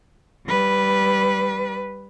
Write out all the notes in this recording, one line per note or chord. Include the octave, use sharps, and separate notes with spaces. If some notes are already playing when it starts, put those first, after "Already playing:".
G3 B4